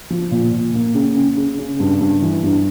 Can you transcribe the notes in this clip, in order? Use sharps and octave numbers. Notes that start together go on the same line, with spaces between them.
F3
A#2
A#2
A#3
C#3
C#3
C#3
C#3
G2
G2
E3
G2